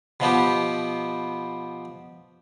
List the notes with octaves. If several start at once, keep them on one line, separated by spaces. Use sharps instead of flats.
B2 F3 B3 G4